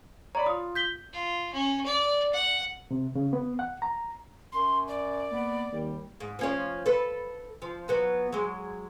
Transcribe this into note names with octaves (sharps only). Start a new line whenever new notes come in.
C#5 D5 A#5 B5
F4 D#6
G6 B6 G7
F4
C#4
D5
F#5
C3
C#3
B3
F#5
A#5
F#2 C6
D5
A#3 B3
D#2 G3
G#2
F3 C#4 C#5
A4 B4
F3
F#3 B3 F#4
F#3 G#3